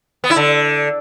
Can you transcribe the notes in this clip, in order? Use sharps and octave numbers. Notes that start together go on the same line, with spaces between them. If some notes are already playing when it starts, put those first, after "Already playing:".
B3
E4
D3